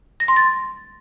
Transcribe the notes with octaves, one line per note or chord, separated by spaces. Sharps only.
A#6
C6
A6